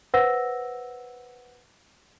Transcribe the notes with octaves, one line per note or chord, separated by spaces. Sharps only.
B4 C5 F#5 E6 A#6